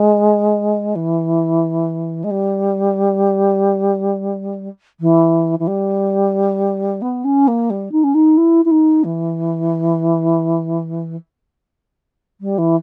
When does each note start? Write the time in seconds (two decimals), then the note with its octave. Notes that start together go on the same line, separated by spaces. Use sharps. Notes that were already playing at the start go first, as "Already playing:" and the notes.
Already playing: G#3
0.95 E3
2.24 G#3
2.30 G3
5.00 E3
5.59 E3
5.67 G3
7.01 B3
7.24 C#4
7.47 A#3
7.70 G3
7.92 D#4
8.03 C#4
8.14 D#4
8.37 E4
8.65 E4
8.71 D#4
9.04 E3
12.40 G3
12.58 E3